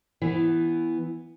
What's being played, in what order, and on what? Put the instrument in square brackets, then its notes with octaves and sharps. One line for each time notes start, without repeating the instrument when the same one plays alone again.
[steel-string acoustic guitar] E3 B3